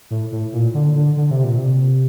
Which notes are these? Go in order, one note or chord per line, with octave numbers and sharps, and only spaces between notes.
A2
A2
A#2
D3
D3
D3
C3
A#2
C3